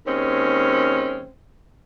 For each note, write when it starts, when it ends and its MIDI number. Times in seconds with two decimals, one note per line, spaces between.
0.07 1.27 39
0.07 1.27 56
0.07 1.27 60
0.07 1.27 61